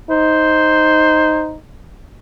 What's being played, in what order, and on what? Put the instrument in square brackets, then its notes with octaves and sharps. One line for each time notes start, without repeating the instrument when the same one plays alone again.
[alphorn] D#4 [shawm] C5